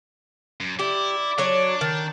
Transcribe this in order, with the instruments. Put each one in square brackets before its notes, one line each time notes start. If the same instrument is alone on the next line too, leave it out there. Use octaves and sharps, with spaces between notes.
[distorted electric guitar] F#2
[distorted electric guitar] E4 [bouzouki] G4 [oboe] D5
[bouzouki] F#3 C#5 [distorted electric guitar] D4
[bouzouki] D#3 [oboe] A5